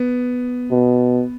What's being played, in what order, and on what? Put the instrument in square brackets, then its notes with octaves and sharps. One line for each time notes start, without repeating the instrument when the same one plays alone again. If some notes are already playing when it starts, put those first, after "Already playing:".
Already playing: [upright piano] B3
[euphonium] B2